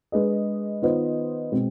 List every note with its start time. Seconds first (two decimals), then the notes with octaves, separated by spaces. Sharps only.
0.12 G#3 D4 G#4 B4 D#5
0.82 D#3 B3 F4 C5 D#5
1.52 B2 G#3 C4